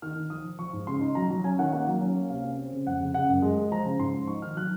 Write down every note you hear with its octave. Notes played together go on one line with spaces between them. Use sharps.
D#3 F6
D#3
F3 D#6
F3
F3 C#6
G#2
C#3 C6
D#4
F#3 A#5
F#3
C#4 G#5
D#3 F#5
A#3 F#5
F#3
C#4
A#3
C3 F5
C#4
C4
C#3
F2 F#5
C#3
C#3 F#5
F#2
G#3
G#3
F3 A#5
C#3
G#2 C6
F3
D#4 C#6
D#3 F6
F#3 F#6